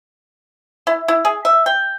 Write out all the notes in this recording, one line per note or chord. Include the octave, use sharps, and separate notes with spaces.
E4
E4
G#4
E5
G5